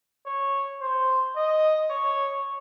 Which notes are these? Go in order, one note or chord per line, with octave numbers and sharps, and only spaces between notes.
C#5
C5
D#5
C#5